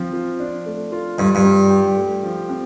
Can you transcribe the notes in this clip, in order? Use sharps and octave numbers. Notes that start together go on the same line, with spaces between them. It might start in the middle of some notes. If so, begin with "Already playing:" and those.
Already playing: F3 C4
F4
D4
A3
F4
G2 D4
G2
G3
G4
A3
F3
C4